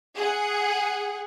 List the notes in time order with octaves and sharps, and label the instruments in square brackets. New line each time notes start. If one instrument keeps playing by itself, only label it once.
[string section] G#4 F#5